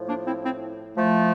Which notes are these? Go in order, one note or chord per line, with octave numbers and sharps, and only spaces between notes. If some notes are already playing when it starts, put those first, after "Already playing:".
Already playing: A2 F3
A#3 D4
C4 E4
C4 E4
F3 A3